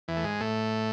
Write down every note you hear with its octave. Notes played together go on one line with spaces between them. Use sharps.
E2 E3
A3
G#2 G#3
A2 A3